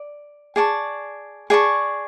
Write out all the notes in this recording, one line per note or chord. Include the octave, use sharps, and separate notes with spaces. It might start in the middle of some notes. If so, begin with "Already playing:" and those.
Already playing: D5
G#4 D5 A5 C#6
G#4 D5 A5 C#6